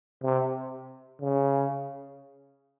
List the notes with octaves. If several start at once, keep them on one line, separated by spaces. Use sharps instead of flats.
C3
C#3